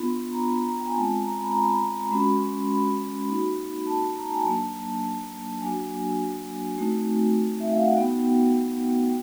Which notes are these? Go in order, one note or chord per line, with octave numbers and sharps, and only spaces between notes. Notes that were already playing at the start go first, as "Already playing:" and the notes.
Already playing: B3 D4 F4 B5
C6
A#5
B5
A#5
G5
G#5
G#3 C4 F4 A5
A#5
B5
A#5
B5
A#5
G#3 C#4 F#4 B5
C6
B5
A#3 D#4 F#4
A5
A#5
A5
G#5
A5
F#3 A#3 D4
F#3 A#3 D4 F#4 G#5
A3 C4 D#4 F#4
E5
F5
F#5
B3 D#4 F#4 G5
G5